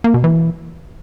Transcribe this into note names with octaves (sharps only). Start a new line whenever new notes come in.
A#3
B2
E3